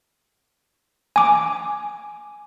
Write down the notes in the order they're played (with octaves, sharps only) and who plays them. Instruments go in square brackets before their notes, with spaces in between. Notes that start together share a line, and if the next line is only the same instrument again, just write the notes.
[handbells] G#5 D6